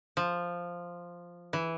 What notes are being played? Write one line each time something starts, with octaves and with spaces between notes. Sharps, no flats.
F3
E3